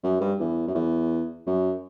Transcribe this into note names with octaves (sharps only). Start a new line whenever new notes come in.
F#2
G2
E2
F#2
E2
F#2